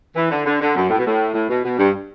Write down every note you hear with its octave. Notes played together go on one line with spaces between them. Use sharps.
E3
D3
D3
D3
F#2
A2
B2
A2
A2
B2
B2
G2